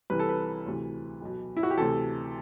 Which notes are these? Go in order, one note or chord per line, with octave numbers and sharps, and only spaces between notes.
C2 C3 E3 B4
A4
B4
D2 C3 E3
B1 B2
E4
F#4
G4
D2 C3 E3 A4